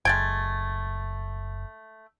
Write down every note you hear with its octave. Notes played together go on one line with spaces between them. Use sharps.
F#1 G#3 A3 G5 G#6 A6